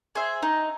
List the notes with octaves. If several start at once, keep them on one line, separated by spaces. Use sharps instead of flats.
G#4 C5 E5
D#4